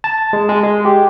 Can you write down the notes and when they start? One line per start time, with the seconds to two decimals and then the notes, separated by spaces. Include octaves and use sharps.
0.04 A5
0.33 G#3
0.49 G#3
0.63 G#3
0.85 G4